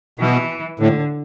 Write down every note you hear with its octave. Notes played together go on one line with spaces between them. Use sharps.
B2 E3
A2 D3